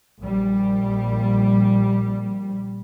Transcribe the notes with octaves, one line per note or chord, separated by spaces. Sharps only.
A#1 G3